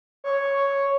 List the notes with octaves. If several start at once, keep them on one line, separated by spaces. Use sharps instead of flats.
C#5